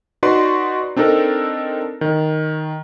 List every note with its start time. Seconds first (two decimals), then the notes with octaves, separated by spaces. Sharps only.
0.23 D#4 F#4 B4 D5 C6
0.96 C4 D4 D#4 A4 A#4
2.01 D#3